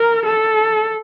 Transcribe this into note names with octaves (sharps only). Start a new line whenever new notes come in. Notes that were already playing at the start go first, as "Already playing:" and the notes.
Already playing: A#4
A4